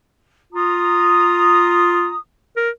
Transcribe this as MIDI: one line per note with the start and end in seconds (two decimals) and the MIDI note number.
0.53 2.14 65
0.53 2.14 82
0.53 2.14 87
2.56 2.70 70